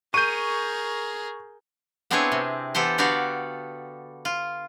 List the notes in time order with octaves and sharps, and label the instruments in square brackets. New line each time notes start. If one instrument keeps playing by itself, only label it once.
[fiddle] G#4 A#4 [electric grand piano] C#6 G6 [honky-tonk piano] D#7
[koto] B3 C4 D4 E4 G#4 C#5
C3
E3 B3 G4 A4 C5
D3 B3 F#4 G4 D5 F5
F4